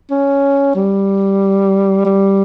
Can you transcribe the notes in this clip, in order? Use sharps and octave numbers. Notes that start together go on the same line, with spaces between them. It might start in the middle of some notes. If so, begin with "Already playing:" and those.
C#4
G3
G3